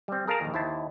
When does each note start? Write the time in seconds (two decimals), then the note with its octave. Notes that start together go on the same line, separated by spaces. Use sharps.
0.08 G3 C4
0.27 G#4 A#4 F5 A5 A#5
0.41 A#1 D#2
0.54 D#2 E4 C5 A5